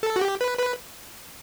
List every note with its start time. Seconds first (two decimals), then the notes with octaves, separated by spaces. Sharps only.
0.03 A4
0.16 F#4
0.21 G4
0.41 B4
0.59 B4